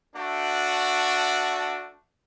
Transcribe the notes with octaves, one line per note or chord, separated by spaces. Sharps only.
A3 D4 F#4